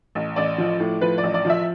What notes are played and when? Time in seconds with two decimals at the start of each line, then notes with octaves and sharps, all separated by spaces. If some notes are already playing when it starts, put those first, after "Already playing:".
0.15 A1
0.36 A1 D5
0.58 F3
0.80 A2
1.01 F3 B4
1.18 D5
1.23 A1
1.34 D5
1.45 F3
1.50 E5